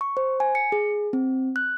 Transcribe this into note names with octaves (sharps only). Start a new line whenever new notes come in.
C#6
C5
G#5
C#7
G#4
C4
F#6